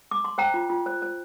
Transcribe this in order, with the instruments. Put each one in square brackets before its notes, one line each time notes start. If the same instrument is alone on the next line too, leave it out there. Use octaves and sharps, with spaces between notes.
[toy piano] D6
C6
C5 G5 A#5
F4
F4
C5
C5